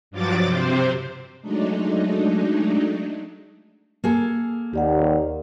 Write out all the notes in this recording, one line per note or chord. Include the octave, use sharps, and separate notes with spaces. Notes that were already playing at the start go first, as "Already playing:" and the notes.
G2 F3 F#3 D6 A6
C3 C4
F#3 G#3 A3 D4 D#4
A#3 G#4 A4
D#2 G4 D5 F#5